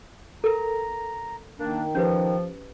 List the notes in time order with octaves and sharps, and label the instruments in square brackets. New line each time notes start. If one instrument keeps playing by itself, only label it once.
[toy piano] A4 A#4 [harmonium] A#5
[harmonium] D#3 [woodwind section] A#3 D4
[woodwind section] F3 [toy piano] C#4 G4 B4